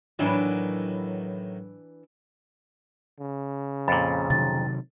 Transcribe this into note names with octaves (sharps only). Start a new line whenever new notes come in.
A2 D#3 E3 F#3 D4 B4
C#3
F2 A#2 B5 A6
C3 D#3 F#3 A6